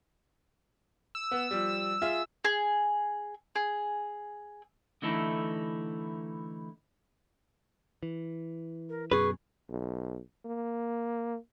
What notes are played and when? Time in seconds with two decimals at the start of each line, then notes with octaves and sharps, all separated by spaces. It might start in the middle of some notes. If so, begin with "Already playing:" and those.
1.15 E6
1.31 B3
1.51 F3 G3
2.02 F4 G#4 E5
2.45 G#4
3.56 G#4
5.02 D3 E3 A3 D#4 E4 A4
8.03 E3
8.89 A#4
9.11 F#2 B2 G#4 B4 C#6
9.70 B1
10.46 A#3